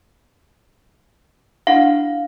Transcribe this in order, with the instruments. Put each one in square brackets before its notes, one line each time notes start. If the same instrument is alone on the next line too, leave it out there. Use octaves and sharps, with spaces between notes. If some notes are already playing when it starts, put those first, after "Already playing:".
[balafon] D4 E4 F#5 [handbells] F5